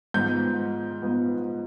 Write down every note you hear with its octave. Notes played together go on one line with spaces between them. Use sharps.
G#2 F3 B3 G6
G#2 F3 B3